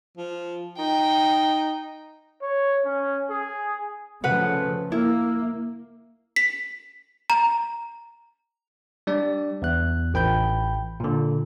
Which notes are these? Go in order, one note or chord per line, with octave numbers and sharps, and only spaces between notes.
F3
D#4 G5
C#5
C#4
G#4
C#3 F3 A3 B4 F#5
A#3 E4
B6
A#5
G3 D4 D5
E2 F#6
A1 G5 B5 G6
A#2 D3